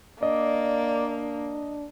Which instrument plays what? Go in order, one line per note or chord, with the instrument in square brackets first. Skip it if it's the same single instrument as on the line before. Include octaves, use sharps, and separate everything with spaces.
[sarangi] A#3 [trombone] D4 [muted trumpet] D5 [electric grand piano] D#5